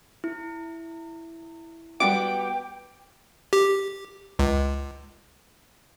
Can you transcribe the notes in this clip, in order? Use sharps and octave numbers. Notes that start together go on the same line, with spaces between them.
E4
G3 B3 F#4 G5 D6
G4
C#2